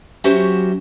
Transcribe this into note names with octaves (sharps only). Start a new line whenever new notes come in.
F#3 C#4 F#4 G4 C5 E5